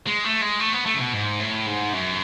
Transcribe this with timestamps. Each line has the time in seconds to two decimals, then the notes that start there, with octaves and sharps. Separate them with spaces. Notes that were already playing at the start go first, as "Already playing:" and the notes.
0.06 G#3
0.24 A3
0.41 G#3
0.60 A3
0.73 B3
0.86 A3
0.94 C#3
1.00 B2
1.12 G#2
1.39 A2
1.66 G#2
1.93 F#2